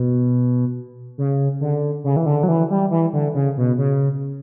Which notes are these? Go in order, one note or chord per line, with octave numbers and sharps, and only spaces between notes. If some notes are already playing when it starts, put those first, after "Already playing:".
Already playing: B2
C#3
D3
C#3
E3
D3
F#3
E3
G3
E3
D3
C#3
B2
C#3